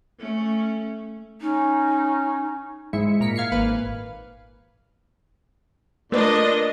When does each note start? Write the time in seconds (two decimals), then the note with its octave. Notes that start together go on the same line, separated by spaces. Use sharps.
0.19 A3 C#4
1.40 C#4 D#4
2.93 G#2 G#3 E4 C#7
3.20 A#2 A#4 B6 C#7
3.36 F5 G#6 C7 C#7
3.52 G#1 A#3 B4 F5
6.12 A#2 A3 D4 B4 D5 D#5